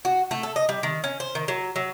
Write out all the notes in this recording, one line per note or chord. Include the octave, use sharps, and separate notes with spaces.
F#4
A3
A4
D#5
G3
D#3
C#4
C5
D#3
F#3
F#3